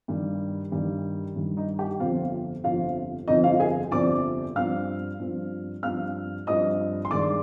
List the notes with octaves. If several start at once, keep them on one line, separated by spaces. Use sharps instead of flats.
G2 D#3 G3
G2 D#3 G3
G2 D#3 G3
D#4 D#5
G4 G5
G1 F2 C3 F3 C4 F4 F5
G1 F2 C3 F3 C4 F4 F5
G1 F2 C3 F3 C4 D#4 D#5
F4 F5
G#4 G#5
G1 F2 C3 F3 C4 D5 D6
G2 F3 C4 F5 F6
G2 F3 C4
G2 F3 C4 F5 F6
G2 F3 C4 D#5 D#6
C6
G2 D#3 G#3 D5 D6